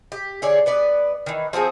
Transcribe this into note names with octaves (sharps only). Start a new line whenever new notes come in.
G4
D3 G#4 C#5 D5
B3 B4 D5
D#3 E3
F3 C4 F#4 G#4